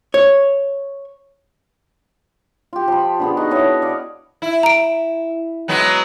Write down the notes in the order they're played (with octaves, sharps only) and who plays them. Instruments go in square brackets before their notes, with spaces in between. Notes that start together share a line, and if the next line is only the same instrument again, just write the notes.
[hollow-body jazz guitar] C#5
[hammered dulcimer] F4 G4
F3 B5
D3 B3 G#4
D#4 F#4 D#5
E4 C#5 D#5 A5
D5 F5
[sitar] E4
[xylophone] A#5 D7
[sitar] F#3 G#3 B3